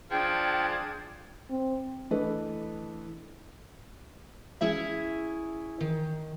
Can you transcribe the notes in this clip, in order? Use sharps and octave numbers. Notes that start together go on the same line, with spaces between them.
F3 D4 G#4 G5 G#6
C4
E3 A3 D4 A4 B4 D#5
C#4 E4 G#4 E5
D#3